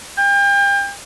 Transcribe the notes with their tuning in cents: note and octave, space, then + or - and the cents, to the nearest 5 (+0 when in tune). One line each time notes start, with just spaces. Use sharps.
G5 +35